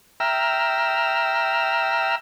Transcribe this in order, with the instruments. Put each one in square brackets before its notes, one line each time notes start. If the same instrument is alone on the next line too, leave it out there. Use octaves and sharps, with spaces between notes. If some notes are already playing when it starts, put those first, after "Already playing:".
[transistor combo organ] E5 G5 A#5 E6 F6